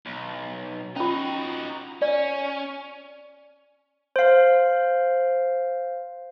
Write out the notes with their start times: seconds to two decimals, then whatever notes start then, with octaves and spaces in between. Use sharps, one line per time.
0.06 B1
0.96 C#4 D#4 F4 F#4
2.02 C#4 D5
4.16 C5 F5